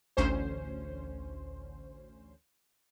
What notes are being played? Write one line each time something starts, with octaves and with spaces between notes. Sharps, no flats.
A1 D2 C#4 C5